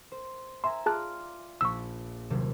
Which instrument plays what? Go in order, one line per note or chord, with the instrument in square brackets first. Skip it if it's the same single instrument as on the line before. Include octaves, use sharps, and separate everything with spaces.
[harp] C5
[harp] E5 G#5 A#5 [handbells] C6
[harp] F4 D5 C6 [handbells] G#4 A5 F#6
[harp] A#1 B6 [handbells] C#6 E6
[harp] D#1 C3 F#3